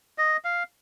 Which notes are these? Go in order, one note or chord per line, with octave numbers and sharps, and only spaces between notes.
D#5
F5